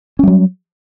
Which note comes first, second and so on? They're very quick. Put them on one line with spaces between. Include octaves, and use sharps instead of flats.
C#4 G3 F#3